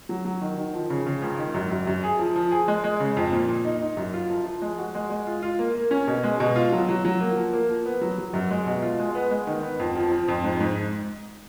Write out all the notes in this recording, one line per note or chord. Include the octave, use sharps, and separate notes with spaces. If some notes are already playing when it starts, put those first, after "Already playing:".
F#3
F#3
D#3
D#3
F3
C#3
C#3
C#2
D#3
F#2
F#2
F#2
G#4
F3
F3
G#4
G#3
G#3
C#3
F2
A#2
A#2
D#4
D#4
F#2
F4
F3
F3
G#3
F#4
G#3
G#3
F4
F4
A#3
A#3
C#4
B2
G#3
B2
F4
F#3
F#3
F#3
A#3
F3
A#3
F3
B3
F#3
F#3
F#2
G#3
B2
F4
G#3
B3
G#3
D#3
B3
F2
F3
F3
F2
G#2
G#2